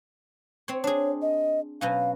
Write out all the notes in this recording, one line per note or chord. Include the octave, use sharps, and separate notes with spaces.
C4 C#5
D4 G#4 C#5
D#5
B2 F#3 C#4 F5